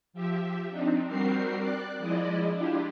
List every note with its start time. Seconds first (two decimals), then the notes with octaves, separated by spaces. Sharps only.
0.13 F3 G4 E5
0.70 C4 D4 D#4
1.07 G3 C4 F#4 G4 A#4 C7
1.59 D5 F#6
1.99 F3 G#3 E4 D5 D#5
2.52 D4 E4 F4 G4